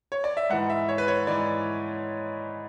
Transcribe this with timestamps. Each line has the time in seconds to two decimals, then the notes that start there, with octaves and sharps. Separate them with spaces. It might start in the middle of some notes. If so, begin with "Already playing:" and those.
0.12 C#5
0.24 D5
0.37 E5
0.50 G#2 E3 F#5
0.70 E5
0.89 C#5
0.98 B4
1.08 C#5
1.27 G#2 E3 D5